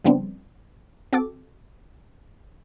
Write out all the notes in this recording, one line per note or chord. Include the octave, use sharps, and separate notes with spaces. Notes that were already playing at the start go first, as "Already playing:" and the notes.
C#3 F3 G3 B3 C4 D4
C4 F#4 A4 D6